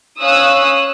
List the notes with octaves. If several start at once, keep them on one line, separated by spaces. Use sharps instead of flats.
C#4 C#5 F5 D#6 E6 F#6